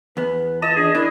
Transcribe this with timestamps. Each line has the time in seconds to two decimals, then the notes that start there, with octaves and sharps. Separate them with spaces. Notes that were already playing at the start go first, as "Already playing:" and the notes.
0.17 E2 B3 B4
0.62 F4 D#5 A5
0.76 D4 G#4
0.95 D4 E4 A#4